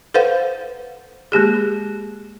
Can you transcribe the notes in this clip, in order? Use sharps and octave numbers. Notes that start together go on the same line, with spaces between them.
A4 B4 C5 F5 F#5
G#3 A#3 G4 G#4